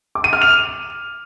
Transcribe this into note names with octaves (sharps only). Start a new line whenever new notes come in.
D6
D#7
F6
F7